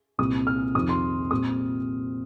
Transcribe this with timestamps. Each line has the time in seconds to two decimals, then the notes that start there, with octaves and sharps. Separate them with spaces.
0.18 C2 A#2 G3 C4 D#6
0.47 F6
0.74 F2 C3 D#3 D#6
0.89 C6
1.31 A#2 G3 C4 D#6